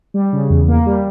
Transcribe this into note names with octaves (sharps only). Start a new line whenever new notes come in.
G3
C#3
E2
A#3
G3